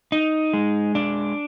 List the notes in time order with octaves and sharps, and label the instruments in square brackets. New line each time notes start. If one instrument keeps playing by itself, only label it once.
[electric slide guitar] D#4
G#3
D4